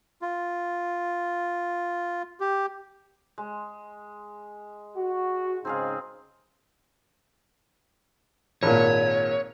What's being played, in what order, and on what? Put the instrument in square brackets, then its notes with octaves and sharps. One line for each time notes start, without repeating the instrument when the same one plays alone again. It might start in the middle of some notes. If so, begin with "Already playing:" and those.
[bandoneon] F4
G4
[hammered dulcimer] G#3
[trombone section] F#4
[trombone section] G#2 C#3 D#4 [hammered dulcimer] C4 G#4 F5
[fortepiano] G#1 A#2 [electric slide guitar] C#5